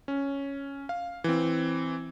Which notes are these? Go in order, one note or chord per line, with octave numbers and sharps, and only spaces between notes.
C#4
F5
E3 C4